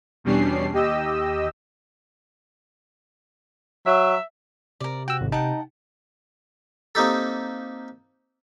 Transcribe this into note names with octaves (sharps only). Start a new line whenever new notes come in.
E2 B2 G3 C#4 D4 C7
D#2 G4 D#5 E6
F#3 E5
C3 A#4 D5
F#4 G5 E6
G#1
D#4 F#5 G5 A5
A#3 C4 D#4 G4 A4